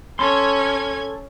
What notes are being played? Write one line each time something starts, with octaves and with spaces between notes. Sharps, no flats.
C#4 A4 G#5 A5 C6 G#6